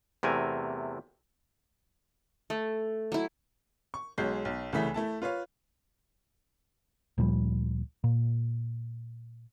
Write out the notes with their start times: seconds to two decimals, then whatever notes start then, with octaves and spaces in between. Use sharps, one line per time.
0.23 E2 C3 A3 A#4 G#5
2.50 A3
3.12 F#3 E4
3.94 C#6
4.18 B1 F#3 G#3 C#5 G6 C7
4.45 B1
4.73 C2 C#3 E3 A3 E5 B6
4.94 A3 E4 A5
5.22 F4 B4 C#5 F5
7.18 D2 A#2 F3 G3
8.04 A#2